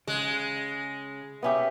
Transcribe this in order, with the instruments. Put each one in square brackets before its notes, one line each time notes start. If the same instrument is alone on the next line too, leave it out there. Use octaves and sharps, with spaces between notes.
[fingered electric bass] C#3 [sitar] G#3
[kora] B3 C#4 G4 [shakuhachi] E5